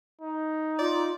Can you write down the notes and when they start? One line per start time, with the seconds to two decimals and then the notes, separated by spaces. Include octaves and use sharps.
0.21 D#4
0.79 F4 D5